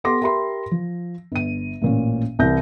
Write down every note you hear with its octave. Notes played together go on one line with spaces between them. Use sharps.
B3 G4 A4 C6 D6 A#6
G4 A#4 E5 B5 C6
F3
G1 D#7
A1 A#2 C#4
C2 E3 G6 A#6